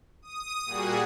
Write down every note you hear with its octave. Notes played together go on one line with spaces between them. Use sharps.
D#6
A#2 G3 F#4 G#4